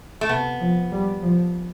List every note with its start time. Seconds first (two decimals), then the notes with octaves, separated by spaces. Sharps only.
0.21 A3
0.29 C3 B3
0.60 F3
0.91 G3
1.22 F3